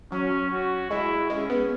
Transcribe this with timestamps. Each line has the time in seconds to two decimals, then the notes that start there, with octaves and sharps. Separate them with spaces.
0.11 F#3 C#4
0.51 F#4
0.90 G#3 E4
1.30 G#3 C#4
1.50 B3